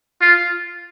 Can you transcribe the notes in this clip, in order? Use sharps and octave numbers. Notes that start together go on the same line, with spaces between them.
F4